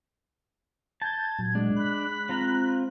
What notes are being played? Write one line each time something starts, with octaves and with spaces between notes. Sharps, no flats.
A5 G6 G#6
A#2 F#3
G#3 D4
B5 F#6
C4 F4 A#5